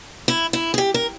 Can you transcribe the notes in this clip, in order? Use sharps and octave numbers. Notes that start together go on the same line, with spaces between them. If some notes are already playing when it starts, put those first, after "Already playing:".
E4
E4
G#4
G4
A#4